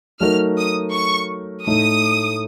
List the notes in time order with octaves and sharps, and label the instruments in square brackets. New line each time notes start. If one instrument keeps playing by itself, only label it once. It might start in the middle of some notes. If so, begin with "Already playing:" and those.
[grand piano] F#3 A3 D#4 F#4 A#4 [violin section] F6
[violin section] D#6
C#6
[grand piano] A2 A3 D#4 [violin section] D#6